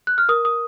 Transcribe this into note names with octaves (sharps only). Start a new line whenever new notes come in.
F#6
F6
A#4 D#6
D#6